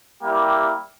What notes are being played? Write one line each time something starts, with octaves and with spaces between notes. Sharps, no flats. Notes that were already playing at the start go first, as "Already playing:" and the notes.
G3 A#3 E4 G4